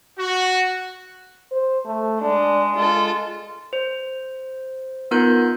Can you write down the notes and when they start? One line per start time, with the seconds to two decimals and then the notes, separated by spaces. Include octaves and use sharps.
0.18 F#4
1.51 C5
1.86 A3
2.21 G#3 D4
2.76 G#3 F4 A4
3.73 C5
5.11 B3 D#4 F4 A#4 F#6 G6